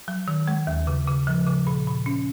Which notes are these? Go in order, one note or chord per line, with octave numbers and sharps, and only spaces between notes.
F#3
D#3
G#3
D#2
C#3
C#3
F3
C#3
A#2
A#2
C#4